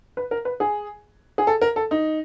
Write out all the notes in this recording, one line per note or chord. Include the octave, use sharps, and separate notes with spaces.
B4
A#4
B4
G#4
G#4
A4
A#4
A4
D#4